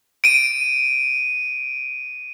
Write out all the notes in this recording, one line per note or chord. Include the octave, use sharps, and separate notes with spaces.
D7 D#7